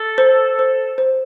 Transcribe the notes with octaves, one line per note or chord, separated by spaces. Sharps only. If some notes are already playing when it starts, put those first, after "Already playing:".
Already playing: A4
C5
C5
C5